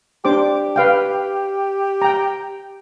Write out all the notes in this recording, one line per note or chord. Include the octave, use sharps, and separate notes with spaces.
D4 G4 C5 D6
B4 F5 G5
G5 A#5